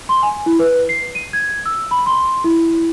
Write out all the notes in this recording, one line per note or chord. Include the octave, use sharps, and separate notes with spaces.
C6
G#5
E4
B4
C7
D#7
G#6
E6
B5
C6
E4